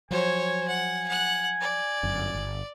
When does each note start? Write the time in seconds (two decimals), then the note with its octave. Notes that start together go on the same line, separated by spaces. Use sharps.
0.11 F3 F#3 C5 C#5 G#5
0.68 F#5
1.08 F#5 F#6
1.61 D5
2.03 G1 F#2
2.35 G1